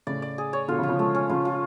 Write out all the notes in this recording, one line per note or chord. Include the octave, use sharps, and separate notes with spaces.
A2 C#3 D5
D5
G#4
C#5
B2 D3 F4
C#3 F3
F4
C#3 F3
F3 G#3 A3
C#4
C#3 F3 F4
F4